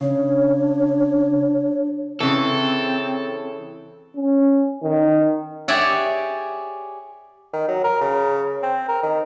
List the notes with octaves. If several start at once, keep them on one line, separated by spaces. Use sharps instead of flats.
C#3 D4 C#5
C#3 E3 C4 A4
C#4
D#3
G4 G#4 C#5 D5 E5 F#5
D#3
F#3
A#4
C#3
C4
A#4
D#3